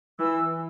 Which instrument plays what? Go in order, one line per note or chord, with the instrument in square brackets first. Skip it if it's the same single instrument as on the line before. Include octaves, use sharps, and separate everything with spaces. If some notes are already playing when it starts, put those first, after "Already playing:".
[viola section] E3 [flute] E6